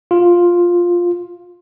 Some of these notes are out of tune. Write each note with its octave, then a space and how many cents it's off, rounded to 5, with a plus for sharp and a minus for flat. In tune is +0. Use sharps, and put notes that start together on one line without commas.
F4 +5